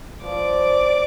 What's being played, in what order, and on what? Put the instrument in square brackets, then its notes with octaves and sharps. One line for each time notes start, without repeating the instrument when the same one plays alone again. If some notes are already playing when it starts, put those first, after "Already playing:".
[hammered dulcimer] F3 [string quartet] D5 D6